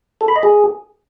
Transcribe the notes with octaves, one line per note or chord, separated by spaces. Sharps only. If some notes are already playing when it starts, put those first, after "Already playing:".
A4
B5
D#5
G#4